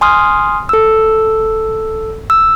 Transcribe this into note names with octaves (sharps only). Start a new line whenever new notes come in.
G#5 C6 D#6 F6
A4 E6
E6